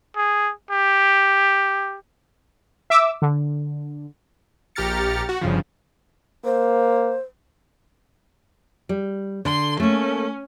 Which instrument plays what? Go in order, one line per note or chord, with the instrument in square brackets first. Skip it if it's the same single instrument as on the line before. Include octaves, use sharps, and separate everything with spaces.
[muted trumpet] G#4
G4
[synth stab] E5 D6 E6
D3
[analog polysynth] A#1 G4 A#5 F6 A6 C#7
F#4
G1 G2 C#3 F3
[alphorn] A#3 [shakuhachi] C5
[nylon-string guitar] G3
[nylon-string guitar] D3 [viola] C6
[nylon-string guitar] A3 A#3 [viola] C#4